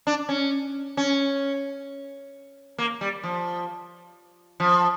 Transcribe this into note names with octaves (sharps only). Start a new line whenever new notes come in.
D4
C#4
C#4
A#3
G3
F3
F3